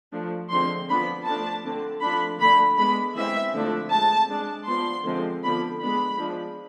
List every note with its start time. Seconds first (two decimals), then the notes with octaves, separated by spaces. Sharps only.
0.12 F3 A3 D4
0.51 D3 F3 G#3 C4 C6
0.89 F3 B3 D4 B5
1.26 F3 A3 D4 A5
1.64 D3 A3 C4
2.02 F3 A3 D4 B5
2.40 D3 A3 D4 B5
2.78 G#3 B3 D4 B5
3.15 E3 G#3 C4 E5
3.54 D3 F3 A3 D4
3.91 G#3 C4 A5
4.29 G#3 D4
4.67 F3 B3 D4 C6
5.05 D3 F3 G#3 C4
5.43 D3 F3 B3 D4 B5
5.80 G#3 B3 D4 B5
6.19 F3 G#3 D4